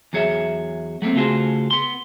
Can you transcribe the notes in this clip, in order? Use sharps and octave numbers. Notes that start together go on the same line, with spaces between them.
E2 F#3 G#4 C#5 D5 E5
F#3 A3 A#3 C4
C#3 A3 F4 F#4 G#4 C5
B3 C6